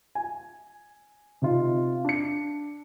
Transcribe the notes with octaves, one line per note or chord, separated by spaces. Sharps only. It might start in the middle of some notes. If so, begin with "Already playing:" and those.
G#5
C3 D#4 F4
D4 C#7